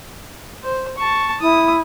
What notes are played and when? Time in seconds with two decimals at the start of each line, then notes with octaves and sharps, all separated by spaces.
0.64 C5
0.98 A5 C#6
1.41 E4 D#6